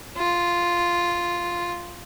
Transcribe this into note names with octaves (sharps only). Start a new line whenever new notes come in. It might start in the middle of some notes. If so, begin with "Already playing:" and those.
F4